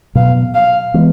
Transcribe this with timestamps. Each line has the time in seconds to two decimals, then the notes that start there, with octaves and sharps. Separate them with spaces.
0.15 B2 F#3 B3 F5
0.55 F5
0.94 E3 G#3 B3